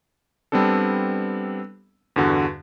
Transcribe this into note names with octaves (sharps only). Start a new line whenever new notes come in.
G3 B3 C4 D4 A4
E2 G2 D3 F#4